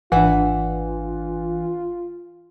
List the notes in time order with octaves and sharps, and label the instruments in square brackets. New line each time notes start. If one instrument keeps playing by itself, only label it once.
[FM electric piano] G#1 D4 [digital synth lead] E3 [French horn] F4 [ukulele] B4 E5 F#5